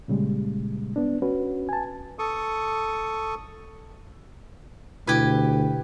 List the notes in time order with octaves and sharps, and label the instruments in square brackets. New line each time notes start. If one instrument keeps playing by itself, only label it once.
[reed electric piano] A#2 C#3 G3 G#3
B3 D4
C#4 F#4 B4
G#5 A5
[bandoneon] A4 C#6 D#6
[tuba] D2 [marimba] B2 E4 G#6 [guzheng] G4 B4